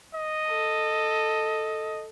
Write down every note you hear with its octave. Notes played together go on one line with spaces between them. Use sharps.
D#5
A4